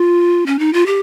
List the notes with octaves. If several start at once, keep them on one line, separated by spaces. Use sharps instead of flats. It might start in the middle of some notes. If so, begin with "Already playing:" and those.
Already playing: F4
C#4
D#4
F4
G4